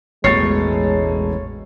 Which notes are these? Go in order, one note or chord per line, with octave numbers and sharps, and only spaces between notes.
E1 A1 G#3 A3 C#5 A6 C7